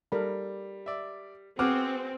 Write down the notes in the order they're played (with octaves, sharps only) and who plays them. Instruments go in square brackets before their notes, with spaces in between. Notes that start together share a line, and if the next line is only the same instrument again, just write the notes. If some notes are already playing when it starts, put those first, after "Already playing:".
[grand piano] G3 [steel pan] A4 A#4 B5
[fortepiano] D5 E5
[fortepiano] B3 F#4 G#4 [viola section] C4 [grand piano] F#5 D6 F6